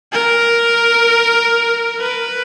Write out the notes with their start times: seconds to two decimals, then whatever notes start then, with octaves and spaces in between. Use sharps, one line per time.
0.13 A#4
2.00 B4